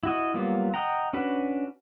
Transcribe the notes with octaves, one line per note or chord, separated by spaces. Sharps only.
E4 F#4 D#5
F#3 G3 A#3 B3 F4
D#5 F#5 G5 A#5
C#4 D4 F#4 B4